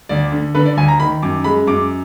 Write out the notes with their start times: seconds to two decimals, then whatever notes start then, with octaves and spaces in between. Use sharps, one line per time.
0.09 D2 D5
0.32 D3
0.55 D3 B4
0.65 D5
0.77 D2 G#5
0.88 A#5
1.00 D#3 B5
1.22 F#2 D6
1.44 G#3 B5
1.67 F#2 D6